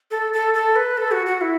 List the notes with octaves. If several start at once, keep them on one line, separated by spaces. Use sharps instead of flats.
A4
A4
A4
B4
A4
F#4
F#4
E4